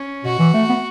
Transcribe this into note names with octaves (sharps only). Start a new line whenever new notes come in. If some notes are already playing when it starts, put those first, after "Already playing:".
Already playing: C#4
B2 F#4
E3
A3
B3